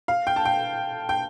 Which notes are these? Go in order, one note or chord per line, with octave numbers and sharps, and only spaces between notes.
F5
G5
A5
G5
G5